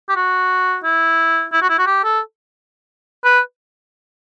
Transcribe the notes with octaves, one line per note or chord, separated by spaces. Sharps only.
G4
F#4
E4
E4
F#4
E4
F#4
G4
A4
B4